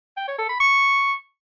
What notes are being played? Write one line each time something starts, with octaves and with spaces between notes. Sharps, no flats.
G5
C#5
A4
B5
C#6